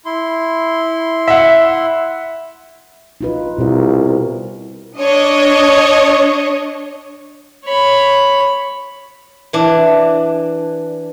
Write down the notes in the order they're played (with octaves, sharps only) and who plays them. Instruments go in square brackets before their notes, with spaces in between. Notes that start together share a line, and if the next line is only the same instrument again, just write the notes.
[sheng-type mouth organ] E4 C6
[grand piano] E5 F#5
[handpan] D#4 F4 B4
[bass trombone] C2 [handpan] B2 A#4
[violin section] D4 C#5 D#5
[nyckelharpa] C#5 B5
[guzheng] E3 D4